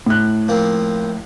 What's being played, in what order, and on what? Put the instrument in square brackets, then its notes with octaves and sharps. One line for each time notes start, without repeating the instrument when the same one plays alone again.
[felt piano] A2 F#6
[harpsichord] F3 A#3 C4